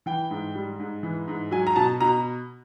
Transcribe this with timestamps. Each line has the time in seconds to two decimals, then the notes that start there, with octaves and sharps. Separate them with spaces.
0.06 E3 G5
0.31 G#2
0.55 G3
0.80 G#2
1.03 E3
1.28 G#2
1.51 F#3 G#5
1.67 A#5
1.76 B2 A5
2.00 B2 A#5